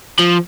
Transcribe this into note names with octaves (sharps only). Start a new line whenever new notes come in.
F3